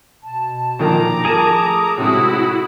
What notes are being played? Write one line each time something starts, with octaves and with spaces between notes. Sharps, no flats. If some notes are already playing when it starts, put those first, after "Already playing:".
B2 A5
A#2 D#3 F3 A#5 D6
F3 G#4 A#4 G#5 A5
A3 A4 D#6
A2 C3 G#3 E4 F#4